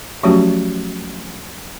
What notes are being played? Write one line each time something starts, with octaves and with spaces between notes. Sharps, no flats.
F3 F#3 A3 C#4 F#4 G4